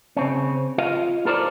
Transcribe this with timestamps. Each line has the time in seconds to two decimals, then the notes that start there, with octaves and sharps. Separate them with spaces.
0.17 C#3 C4 C#4
0.78 F4 D#5 F5
1.26 F4 A4 A#4 C5 D5